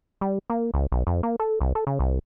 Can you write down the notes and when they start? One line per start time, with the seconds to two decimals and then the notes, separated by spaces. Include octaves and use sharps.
0.21 G3
0.50 A#3
0.74 C#2
0.92 B1
1.07 F2
1.23 A#3
1.40 A4
1.61 C2
1.75 A4
1.87 C#3
1.99 C2